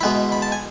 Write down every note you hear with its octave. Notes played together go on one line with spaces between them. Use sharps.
B2 G#3 B3 E4 B5
B5
A5
G#5